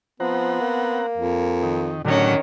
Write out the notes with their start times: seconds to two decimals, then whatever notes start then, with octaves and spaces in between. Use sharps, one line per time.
0.20 F3 B3 C4 F#5 A#5
0.61 A#3
1.18 F2
1.63 D#3
2.05 A2 D3 D#3 F#3 G3 C#4 F#5